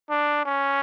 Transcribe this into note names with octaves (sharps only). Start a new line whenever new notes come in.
D4
C#4